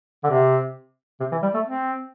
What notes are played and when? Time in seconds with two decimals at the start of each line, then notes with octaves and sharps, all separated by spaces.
0.24 D3
0.30 C3
1.20 C3
1.32 E3
1.42 G3
1.54 A3
1.65 C4